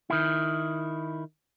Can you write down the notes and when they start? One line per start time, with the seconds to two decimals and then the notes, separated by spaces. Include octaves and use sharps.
0.10 D#3 E4